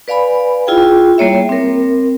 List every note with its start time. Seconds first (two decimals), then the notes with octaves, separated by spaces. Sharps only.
0.08 B4 D5 F5 G#5 B5
0.67 E4 F4 G#4 G5
1.18 G3 A#3 C#5 E5
1.49 C4 A#4